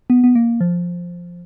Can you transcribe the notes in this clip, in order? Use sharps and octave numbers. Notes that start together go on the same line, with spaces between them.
B3
B3
A#3
F3